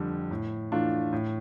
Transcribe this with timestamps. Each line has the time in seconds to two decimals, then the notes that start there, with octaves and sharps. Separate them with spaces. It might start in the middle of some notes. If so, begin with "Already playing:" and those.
Already playing: F2 D3 G3
0.31 A2
0.72 E3 A3 D4 F4
1.13 A2